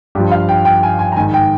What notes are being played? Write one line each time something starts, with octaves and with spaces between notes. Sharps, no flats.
G2 F3 G4
F5
G5
G5
G#5
G#5
A#5
G#2 D#3 G#5
G5